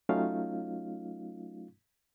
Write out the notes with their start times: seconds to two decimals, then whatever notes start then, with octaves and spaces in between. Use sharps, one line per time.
0.09 F#3 A3 C#4 D#4 F4 F5